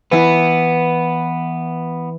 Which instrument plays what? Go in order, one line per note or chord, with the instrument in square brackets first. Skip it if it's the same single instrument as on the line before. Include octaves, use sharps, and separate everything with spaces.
[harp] E3 E4 [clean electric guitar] B3